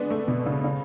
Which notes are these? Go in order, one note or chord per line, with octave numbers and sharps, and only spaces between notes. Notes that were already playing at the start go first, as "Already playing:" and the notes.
Already playing: G#3 B3 D4
A3
B2
C#3
C#3